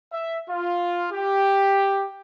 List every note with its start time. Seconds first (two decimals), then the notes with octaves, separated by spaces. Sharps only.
0.13 E5
0.49 F4
1.12 G4